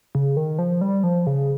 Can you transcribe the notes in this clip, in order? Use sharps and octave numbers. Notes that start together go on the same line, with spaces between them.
C#3
D#3
F3
G3
F3
C#3